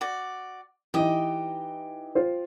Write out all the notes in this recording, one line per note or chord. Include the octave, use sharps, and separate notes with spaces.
F#4 D5
E3 D#4 G4 D#5
F4 C5